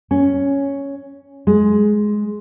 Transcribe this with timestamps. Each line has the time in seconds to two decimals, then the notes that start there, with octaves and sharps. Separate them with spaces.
0.11 C#4
1.47 G#3